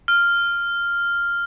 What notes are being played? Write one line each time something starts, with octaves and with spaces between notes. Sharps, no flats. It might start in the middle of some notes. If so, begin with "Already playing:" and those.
F6